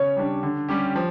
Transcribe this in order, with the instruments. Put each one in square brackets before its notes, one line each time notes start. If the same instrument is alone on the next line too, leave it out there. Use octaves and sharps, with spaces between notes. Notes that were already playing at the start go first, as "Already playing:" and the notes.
Already playing: [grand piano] C#3 [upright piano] C#5
[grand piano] G3 D4
D3
G3 C#4 G4
F3